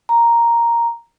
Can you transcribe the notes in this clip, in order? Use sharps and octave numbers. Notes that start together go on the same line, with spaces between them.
A#5